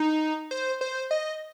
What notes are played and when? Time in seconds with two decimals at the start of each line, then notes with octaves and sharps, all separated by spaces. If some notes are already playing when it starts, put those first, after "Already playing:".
Already playing: D#4
0.51 C5
0.81 C5
1.11 D#5